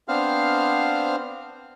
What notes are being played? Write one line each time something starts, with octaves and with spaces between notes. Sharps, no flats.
B3 C4 D4 C5 F5 F6